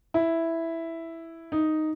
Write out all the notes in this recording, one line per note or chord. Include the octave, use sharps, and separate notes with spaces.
E4
D#4